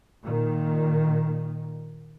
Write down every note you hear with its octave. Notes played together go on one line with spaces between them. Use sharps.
A#2 D#3